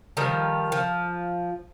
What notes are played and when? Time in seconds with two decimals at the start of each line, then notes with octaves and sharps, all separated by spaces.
0.17 D#3 F3 G3
0.72 F3